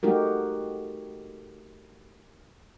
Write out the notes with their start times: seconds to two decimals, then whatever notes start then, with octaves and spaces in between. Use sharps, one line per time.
0.03 A3 D#4 F#4 G4 A#4